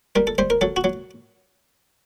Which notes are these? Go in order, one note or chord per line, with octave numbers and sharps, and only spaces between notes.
G3 A#4
A4
G3 C5
A#4
F#3 A4
F#4
F#3